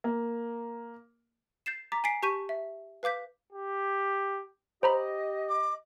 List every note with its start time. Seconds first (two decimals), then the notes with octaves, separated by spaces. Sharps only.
0.04 A#3
1.66 G6 A6 C7 E7
1.92 A#5 D6 A6 B6
2.04 G#5 A6 B6 C7 D7
2.22 G4 A5 C#6 G6 B6 D#7
2.49 E5
3.03 B4 F5 D6 G6 B6
3.52 G4
4.83 G4 C5 D#5 A#5 B5
5.49 D6